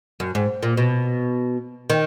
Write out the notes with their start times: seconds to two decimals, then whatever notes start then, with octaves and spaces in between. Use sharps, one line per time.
0.20 F#2
0.35 G#2
0.63 A#2
0.77 B2
1.90 D#3